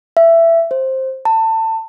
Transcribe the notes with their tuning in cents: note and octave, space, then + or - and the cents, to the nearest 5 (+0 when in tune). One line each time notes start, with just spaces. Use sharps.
E5 +15
C5 +10
A5 +25